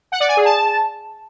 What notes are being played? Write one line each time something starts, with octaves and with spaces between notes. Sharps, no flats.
F#5
D5
G#5
G#4
A5